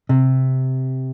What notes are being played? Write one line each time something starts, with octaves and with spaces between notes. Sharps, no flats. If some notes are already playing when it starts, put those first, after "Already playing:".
C3